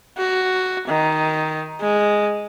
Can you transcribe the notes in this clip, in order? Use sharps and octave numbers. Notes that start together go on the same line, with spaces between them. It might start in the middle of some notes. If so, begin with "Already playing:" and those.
F#4
D#3
G#3